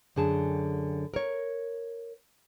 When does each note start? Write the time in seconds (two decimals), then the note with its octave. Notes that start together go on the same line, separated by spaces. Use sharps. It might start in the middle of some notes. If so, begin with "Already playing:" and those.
0.16 F#2 D3 G#4 A5
1.14 A#4 C#5